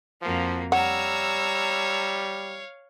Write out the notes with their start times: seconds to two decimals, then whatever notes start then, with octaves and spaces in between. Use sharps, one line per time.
0.22 F2 F3 A#3 F#4
0.72 G3 C#5 F5 F#5 A#5 E6